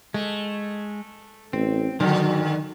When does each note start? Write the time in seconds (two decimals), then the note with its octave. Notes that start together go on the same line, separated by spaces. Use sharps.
0.14 G#3 A3
1.53 A1 C4
2.00 G2 D3 D#3 F#3